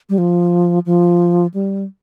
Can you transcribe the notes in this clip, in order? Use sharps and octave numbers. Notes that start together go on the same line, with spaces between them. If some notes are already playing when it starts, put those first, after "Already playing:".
G3
F3
F3
G3